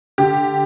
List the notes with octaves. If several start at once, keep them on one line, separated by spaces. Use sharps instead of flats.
D3 G4